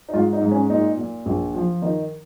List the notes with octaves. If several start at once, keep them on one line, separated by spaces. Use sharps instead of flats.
D#4
G#2 F4
D#4
G#2
C#4
A#2 D#4
A#2
A#1
F3
D#3 D#4